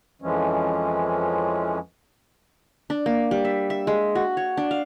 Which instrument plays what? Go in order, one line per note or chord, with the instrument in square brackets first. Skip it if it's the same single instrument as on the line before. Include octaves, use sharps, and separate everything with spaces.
[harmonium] F2 E3 F3 G#3 C#4
[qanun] D4
A#3
G3
E5
E5
G#3
F#4
C#5
D4
F5